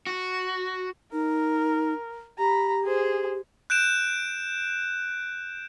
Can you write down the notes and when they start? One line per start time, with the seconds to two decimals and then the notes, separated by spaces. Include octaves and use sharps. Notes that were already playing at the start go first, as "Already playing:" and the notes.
0.07 F#4
1.13 D#4 A#4
2.38 G4 A#5 B5
2.84 G#4 C5
3.70 F#6 G6 D7 E7